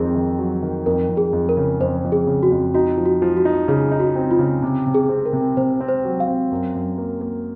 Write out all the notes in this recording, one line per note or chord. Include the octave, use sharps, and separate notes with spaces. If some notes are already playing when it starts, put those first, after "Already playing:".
Already playing: F2 D#3 C4 G#4
D#3
F#3
D#3
F2 A#4
F2
G#4
F2
A#4
C#3
F2 C5
F2
G#4
C#3
F#4
F2
D#4 F#4
F3
F#4
F3
F#4
D#4
C#3 G#4
D#4
F#4
C4
F4
C#3
C3
C3
G#4
C4
A#4
C3
C3 C5
C4
C5
F#3
F5
C4
F#2
F#2
A#3
A#3